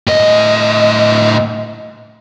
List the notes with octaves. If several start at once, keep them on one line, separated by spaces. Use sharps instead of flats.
A2 D#5